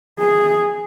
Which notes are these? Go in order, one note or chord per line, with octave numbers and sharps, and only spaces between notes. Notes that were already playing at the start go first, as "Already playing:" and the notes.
G#4